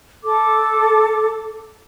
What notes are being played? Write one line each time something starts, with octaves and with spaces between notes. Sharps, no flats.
A4 D6